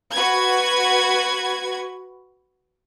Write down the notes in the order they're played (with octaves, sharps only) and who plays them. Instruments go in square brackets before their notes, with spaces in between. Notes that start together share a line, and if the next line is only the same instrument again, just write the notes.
[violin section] F#4 B4 G#6